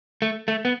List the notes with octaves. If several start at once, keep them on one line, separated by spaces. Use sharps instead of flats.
A3
A3
B3